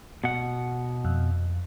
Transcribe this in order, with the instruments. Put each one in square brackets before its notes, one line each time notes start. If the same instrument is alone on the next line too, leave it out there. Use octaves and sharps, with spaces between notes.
[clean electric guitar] B2 F#5
[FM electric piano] F2